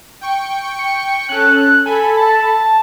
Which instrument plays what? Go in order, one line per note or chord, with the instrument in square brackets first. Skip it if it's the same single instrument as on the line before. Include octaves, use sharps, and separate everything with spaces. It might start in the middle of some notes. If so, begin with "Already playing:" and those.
[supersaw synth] G5 C#6
[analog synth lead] C#7
[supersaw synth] C#4 A4 [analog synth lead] F#6
[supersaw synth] A4 B5 [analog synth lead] G#5
[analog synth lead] A5